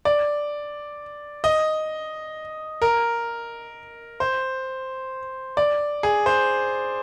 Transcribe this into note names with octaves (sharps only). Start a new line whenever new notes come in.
D5
D#5
A#4
C5
D5
G#4
C5